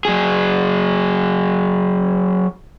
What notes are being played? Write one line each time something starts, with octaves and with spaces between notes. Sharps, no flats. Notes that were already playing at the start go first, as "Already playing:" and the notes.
F#3 G#4